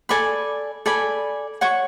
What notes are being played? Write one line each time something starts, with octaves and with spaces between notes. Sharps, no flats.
A4 D5 G#5 B5
A4 D5 G#5 B5
C#5 F#5 C#6